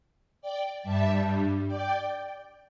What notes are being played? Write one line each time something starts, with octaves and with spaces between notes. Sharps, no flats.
D5 G5
G2 G3 E5 A5
D5 G5